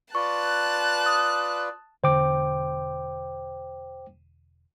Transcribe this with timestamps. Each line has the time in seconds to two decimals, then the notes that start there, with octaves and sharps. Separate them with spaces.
0.15 F4 B4 D5 A5 C#6 F#6
1.06 D#6
2.04 E1 D3 C5 G5 D6